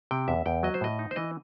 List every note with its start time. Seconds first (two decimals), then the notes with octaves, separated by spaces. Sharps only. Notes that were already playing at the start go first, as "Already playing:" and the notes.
0.11 C3 G5
0.28 E2 E5
0.46 E2 G5
0.63 F#3 D#5
0.74 C5
0.81 A2 D#5
0.99 D#4
1.11 C5
1.16 E3 D#5